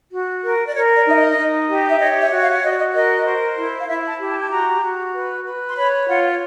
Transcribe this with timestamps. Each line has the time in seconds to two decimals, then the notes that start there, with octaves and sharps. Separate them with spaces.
0.11 F#4
0.43 A#4
0.67 D5
0.74 A#4 C#5
0.95 D5
1.06 D#4 E5
1.16 D#5
1.37 D#4
1.68 G4
1.89 E5
1.99 C#5 D#5
2.20 E5
2.30 F#4
2.41 F5
2.62 F#4 D#5
2.69 D5
2.78 D#5
2.93 A#4 D#5
3.25 C5
3.57 E4
3.79 F5
3.87 E4 E5
4.08 A5
4.19 G4
4.29 A5
4.42 A5
4.50 F#4 A#5
4.81 F#4
5.13 B4
5.44 B4
5.69 C6
5.76 C#5 B5
6.08 F4 F#5